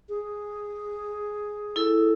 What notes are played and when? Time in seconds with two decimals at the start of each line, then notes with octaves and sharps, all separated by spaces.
0.09 G#4
1.76 E4 A4 E6